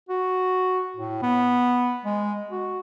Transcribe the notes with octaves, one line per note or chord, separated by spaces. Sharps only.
F#4
A2
B3
G#3
F#4